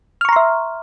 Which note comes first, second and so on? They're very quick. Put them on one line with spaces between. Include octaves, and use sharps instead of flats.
F6 C#6 A#5 C6 E5